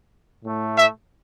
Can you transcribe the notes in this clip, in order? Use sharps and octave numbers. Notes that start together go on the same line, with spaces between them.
A2 A3
E5